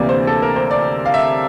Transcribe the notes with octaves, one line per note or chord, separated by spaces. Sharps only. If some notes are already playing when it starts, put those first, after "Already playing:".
Already playing: D2 C3 E3 A#3 D5
C5
A4
A#4
C5
D5
F5
E5